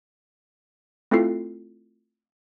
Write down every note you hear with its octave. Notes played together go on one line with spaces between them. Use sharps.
A3 C4 E4 F4 A4 C7